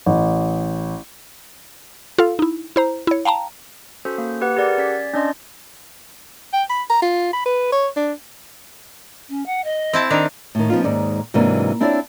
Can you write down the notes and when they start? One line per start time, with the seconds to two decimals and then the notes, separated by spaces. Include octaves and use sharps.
0.06 A1
2.18 F4 A4 F5
2.39 D#4 E4
2.76 E4 C5 A#5
3.07 E4 C#5
3.25 F5 G5 A5 A#5
4.05 C#4 F#4 A4 C5
4.18 A#3
4.41 G4 B4 F#5
4.56 G4 G#4 A#4 D5 F#5
4.78 C#4 D5 G#6 B6
5.14 C#4 D4 D5 D#5 C6
6.53 G5
6.70 B5
6.90 A#5
7.02 F4
7.33 B5
7.46 B4
7.72 C#5
7.97 D4
9.29 C#4
9.46 F#5
9.64 D#5
9.93 C4 E4 A5
10.10 D#3 D4 A#5
10.55 A2 D#3
10.70 F3 B3 C#4 D#4 F4
10.84 D#2 G#2 D#3 G#3 D5
11.34 G#2 C3 E3 F#3 A#3 D4
11.80 C4 D4 E4 F4 C#5 D5